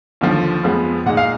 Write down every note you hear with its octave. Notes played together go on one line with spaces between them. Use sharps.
D#2 D3 F3
F2 F3 G#3 B3
A#2 G#3 D#4 F#5
F5